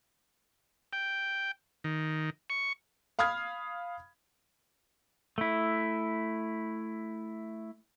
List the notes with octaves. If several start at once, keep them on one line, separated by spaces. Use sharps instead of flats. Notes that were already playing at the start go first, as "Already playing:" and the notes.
G5
D#3
C#6
F5 B5 D#6 F6 G#6
A3 E4